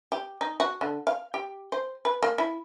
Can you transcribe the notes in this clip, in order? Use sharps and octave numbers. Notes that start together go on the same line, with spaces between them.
G4
D#4
F#4
D3
F5
G4
C5
B4
A#3
E4